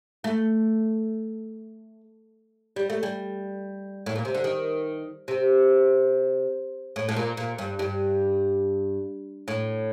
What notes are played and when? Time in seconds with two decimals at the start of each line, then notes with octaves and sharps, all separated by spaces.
0.24 A3
2.76 G3
2.90 A3
3.03 G3
4.06 A2
4.16 A#2
4.25 C3
4.35 D3
4.44 D#3
5.28 C3
6.96 A2
7.09 A2
7.16 A#2
7.37 A#2
7.58 G2
7.79 G2
9.48 A2